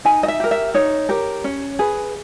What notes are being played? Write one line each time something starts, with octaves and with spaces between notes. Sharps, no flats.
D#4 G#5
D#5
E5
G4 A#4
E5
D#4 C#5
G4 A#4
C#4
G#4 B4